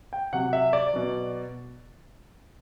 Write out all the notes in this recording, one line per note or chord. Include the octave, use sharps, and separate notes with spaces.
G5
C3 F#3 F#5
E5
D5
B2 F#3